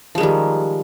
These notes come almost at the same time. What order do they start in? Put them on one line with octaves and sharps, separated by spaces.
F3 G#3 D#3 G3